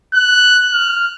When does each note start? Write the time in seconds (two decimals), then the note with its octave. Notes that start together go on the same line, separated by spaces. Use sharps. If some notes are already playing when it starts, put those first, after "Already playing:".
0.14 F#6
0.73 F6